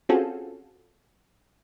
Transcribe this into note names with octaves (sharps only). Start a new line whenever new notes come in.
C4 C#4 F4 F#4 G#4 A4